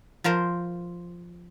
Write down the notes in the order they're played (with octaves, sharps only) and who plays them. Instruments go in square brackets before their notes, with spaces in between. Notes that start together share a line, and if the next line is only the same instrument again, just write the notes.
[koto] F3 F4 A#4 C5